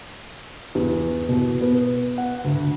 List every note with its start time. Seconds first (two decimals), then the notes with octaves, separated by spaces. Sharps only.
0.75 E2
1.29 B2
1.61 B3
2.18 F#5
2.44 D2